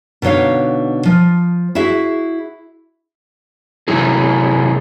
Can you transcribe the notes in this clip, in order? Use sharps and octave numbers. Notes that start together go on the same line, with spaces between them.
B2 D3 D#4 C#5 F5
F3
E4 F#4 G#4 E5
C3 F#3 E4 G#4